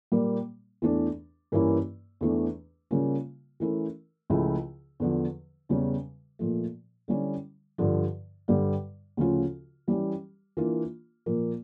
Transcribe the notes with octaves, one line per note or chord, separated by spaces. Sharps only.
A#2 G3 A#3
E2 E3 A3 D4
G2 E3 A#3 C#4 E4
E2 E3 A3 D4
C#3 G3 A#3 C#4 F4
E3 A3 C#4 E4 A#4
C#2 C#3 F3 A3 E4
E2 D3 F3
E2 C#3 G3 C#4
A#2 F3 A3
D3 G3 C#4 E4
G2 D3 F3
G2 D3 G3
D2 C#3 F3 C#4 F4
E3 G3 C#4 G4
E3 A#3 D4 F4
A#2 F3 A#3